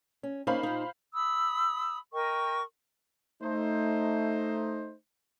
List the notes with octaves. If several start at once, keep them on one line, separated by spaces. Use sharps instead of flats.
C#4
A#3 C#4 D#4 C5 F5 B5
A#2 D#4
B5 D#6 E6
A#4 D#5 G5 C#6
A3 D#4 C5